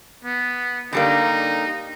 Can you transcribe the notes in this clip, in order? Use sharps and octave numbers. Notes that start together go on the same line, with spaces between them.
B3
D3 G3 A#3 D#4